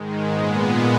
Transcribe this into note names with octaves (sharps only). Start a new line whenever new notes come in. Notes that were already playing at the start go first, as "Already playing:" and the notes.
Already playing: G#2 D#3 G#3
A#2 G#3 B3